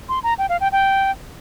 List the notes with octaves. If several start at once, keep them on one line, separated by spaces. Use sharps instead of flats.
C6
A#5
G5
F5
G5
G5